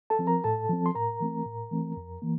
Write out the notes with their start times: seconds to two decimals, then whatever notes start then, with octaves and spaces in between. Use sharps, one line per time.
0.10 A4 A5
0.19 F3 C4
0.27 A#4 A#5
0.44 A2 A4 A5
0.69 F3 C4
0.86 C6
0.95 A2 A#4 A#5
1.20 E3 A3 C4
1.46 A2
1.71 E3 A3 C4
1.97 F2
2.22 E3 A#3